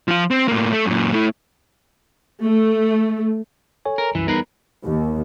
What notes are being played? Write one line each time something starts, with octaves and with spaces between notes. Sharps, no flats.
F3 F4
C4
A2 A#3
A3
F#2 A#2
A3 E4
A3
A4 C#5 G#5
A#4
C2 F#2 E3
E2 G3 D#4 A#4 B4 C7
D#2